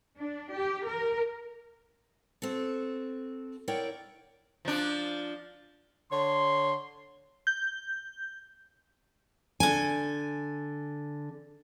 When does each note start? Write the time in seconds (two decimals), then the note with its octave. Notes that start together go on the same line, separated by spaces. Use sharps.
0.18 D4
0.53 G4
0.86 A#4
2.42 C4 F#4 A4
3.68 E4 A#4 C#5 D5 F#5 G5
4.65 F3 D4
6.11 D3 C#5 C6
7.47 G6
9.60 D3 G#5